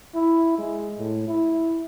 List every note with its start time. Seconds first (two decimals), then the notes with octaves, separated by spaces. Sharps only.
0.14 E4
0.58 G#3
0.98 A2
1.27 E4